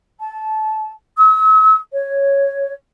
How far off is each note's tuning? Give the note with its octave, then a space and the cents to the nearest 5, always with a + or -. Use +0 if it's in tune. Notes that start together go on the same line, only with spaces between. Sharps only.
A5 -20
E6 -45
C#5 +0